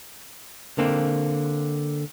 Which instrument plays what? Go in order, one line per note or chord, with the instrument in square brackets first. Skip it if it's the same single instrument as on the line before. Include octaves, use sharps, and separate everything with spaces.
[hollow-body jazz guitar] D3 A#3 C4